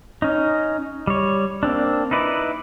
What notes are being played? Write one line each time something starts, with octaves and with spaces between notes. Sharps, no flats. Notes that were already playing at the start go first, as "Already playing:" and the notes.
C#4 D#4
G3 C#5
A#3 C4 D4
D#4 E4 B4 D5